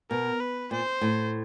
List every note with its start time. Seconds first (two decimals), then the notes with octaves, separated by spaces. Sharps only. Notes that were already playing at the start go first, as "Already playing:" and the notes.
0.10 B2 A#4
0.40 B4
0.71 A#2 C5
1.01 A2